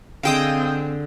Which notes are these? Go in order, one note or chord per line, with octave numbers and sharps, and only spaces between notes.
D3 C4 G#4 D#5 F5 G5 D#6